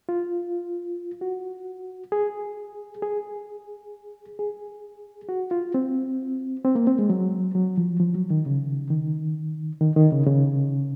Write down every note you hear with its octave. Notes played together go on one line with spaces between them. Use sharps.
F4
F#4
G#4
G#4
G#4
F#4
F4
C4
C4
A#3
C4
G#3
F#3
F#3
F3
F3
F#3
D#3
C#3
D#3
D#3
D#3
C#3
C#3